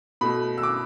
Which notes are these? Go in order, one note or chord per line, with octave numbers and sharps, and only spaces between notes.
B2 A3 B5
E6
D6